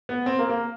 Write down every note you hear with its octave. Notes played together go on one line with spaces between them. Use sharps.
B3
C4
A#3
A#3